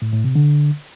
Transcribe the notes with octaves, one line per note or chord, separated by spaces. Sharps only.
A2
A2
C3
D3